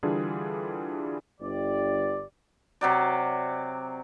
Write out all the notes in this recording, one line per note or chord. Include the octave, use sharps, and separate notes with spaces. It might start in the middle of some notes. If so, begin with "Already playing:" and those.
D3 E3 G3 D4 F4 G#4
G1 G4 D5
C3 F#3 D5